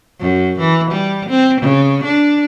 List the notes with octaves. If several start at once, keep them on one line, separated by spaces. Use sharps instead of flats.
F#2
E3
G3
C4
C#3
D4